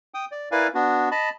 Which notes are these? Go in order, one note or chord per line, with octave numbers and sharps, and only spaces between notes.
G5 D#6
D5
E4 A#4 B4 D5 F5 G#5
B3 D4 F#4
D#5 A5 B5